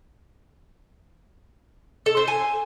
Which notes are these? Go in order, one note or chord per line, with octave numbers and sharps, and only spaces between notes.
A4
C5
G#5